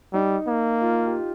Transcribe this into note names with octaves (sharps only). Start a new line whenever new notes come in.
G3 D#4
A#3
F4
G4